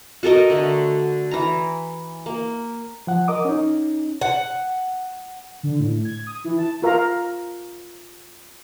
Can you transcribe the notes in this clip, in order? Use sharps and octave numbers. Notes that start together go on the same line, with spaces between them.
F#4 A4 A#4 D#5
D3 A3
E3 A#5
A#3
F3 F#5
A#4 D#5 D6 D#6
C#4 D#4
F#5
D3
A2
G#6
D#6
E3
A5
F4 A#4 F5 A#5